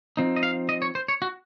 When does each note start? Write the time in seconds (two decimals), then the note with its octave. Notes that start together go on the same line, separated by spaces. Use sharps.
0.17 F3 C4 D#4
0.36 D#5
0.43 F5
0.69 D#5
0.82 C#5
0.95 C5
1.08 C#5
1.22 F#4